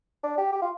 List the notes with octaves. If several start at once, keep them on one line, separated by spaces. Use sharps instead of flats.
D4
G4
G4
F4